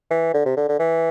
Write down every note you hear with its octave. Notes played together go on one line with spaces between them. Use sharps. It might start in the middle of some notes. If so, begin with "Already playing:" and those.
E3
D3
C3
D3
D3
E3